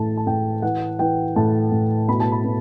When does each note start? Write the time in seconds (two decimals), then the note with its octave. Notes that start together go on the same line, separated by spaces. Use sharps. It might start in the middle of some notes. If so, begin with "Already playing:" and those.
Already playing: A2 E3 A5
0.17 A5
0.26 A2 G5
0.62 E3 F#5
0.99 E3 G5
1.36 A2 A5
1.72 A2
2.08 B2 B5
2.20 A5
2.32 B5
2.44 B2